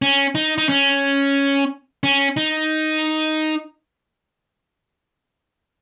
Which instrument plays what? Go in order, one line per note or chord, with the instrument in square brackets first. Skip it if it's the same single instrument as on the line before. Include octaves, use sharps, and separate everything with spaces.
[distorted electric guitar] C#4
D#4
D#4
C#4
C#4
D#4